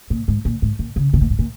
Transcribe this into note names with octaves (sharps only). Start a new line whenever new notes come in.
A#2
G#2
A#2
G#2
A#2
C#3
C#3
A#2
G#2
A#2